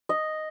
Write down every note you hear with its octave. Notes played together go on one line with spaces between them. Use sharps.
D#5